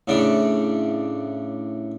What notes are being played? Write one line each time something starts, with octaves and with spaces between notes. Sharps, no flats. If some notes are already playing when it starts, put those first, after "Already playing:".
A2 C#3 D4 D5